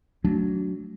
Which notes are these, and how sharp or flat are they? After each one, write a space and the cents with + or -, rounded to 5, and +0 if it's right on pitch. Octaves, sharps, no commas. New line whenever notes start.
F#3 +0 A3 +0 D4 -20